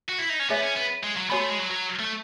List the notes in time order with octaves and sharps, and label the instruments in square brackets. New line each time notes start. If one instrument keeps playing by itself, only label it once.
[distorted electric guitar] F#4
E4
D#4
C#4
[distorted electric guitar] B3 [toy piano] G#4 C#5 E5 G#5
[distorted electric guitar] C#4
B3
G#3
F#3
[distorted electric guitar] B3 [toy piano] F#4 C#5 G#5 B5
[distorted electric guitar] A3
G#3
F#3
F#3
A3